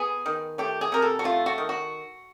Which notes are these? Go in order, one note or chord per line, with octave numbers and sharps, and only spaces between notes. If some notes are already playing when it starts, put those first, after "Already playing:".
Already playing: B3 G#4
D#3
A3 G4
G#4
C3 A#4
A4
F#4
A3 F4
F#4
D#3
F#4